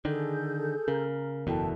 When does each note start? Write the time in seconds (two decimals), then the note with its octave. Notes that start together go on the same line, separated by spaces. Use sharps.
0.05 D3 D#3 G#4 A4 G6
0.88 C#3 A#4
1.47 F#1 E2 B2 B3 E4 A4 G5 A5